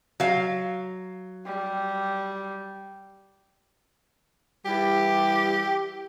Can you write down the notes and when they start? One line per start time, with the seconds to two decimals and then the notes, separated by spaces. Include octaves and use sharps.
0.20 F#3 F5
1.46 G3
4.65 E3 G3 G4